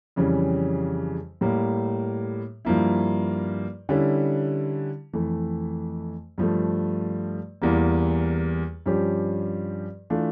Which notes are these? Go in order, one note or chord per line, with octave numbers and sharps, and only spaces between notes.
F2 C#3 E3 G3 C#4
A2 G3 A#3
G2 F3 A#3 E4
D3 G3 C#4 E4
F2 E3 A3
G2 F3 A3
E2 E3 G3 A#3
G2 F3 C#4 G4
E3 A3 D4 F4